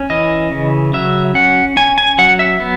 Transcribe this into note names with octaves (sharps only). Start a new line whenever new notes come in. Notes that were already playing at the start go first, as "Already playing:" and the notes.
Already playing: C#4
E3 D#5
C#3
F#3 E5
C#4 F#5
C#4 G#5
G#5
F#3 F#5
E5
B3